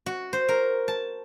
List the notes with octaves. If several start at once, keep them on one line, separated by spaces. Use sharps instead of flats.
F#4
C5
A#4
A5